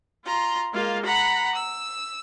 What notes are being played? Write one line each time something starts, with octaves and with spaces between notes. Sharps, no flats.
F4 A#5 C6
G#3 A#3 F4 F5
F#5 A#5 B5
E6